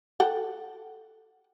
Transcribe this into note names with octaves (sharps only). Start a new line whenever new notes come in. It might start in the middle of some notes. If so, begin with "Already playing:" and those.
A4 F#5 G5